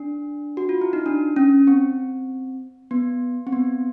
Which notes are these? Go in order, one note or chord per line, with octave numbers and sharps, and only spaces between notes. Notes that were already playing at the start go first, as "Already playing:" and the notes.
Already playing: D4
F#4
F4
E4
D#4
D4
C#4
C4
B3
C4
B3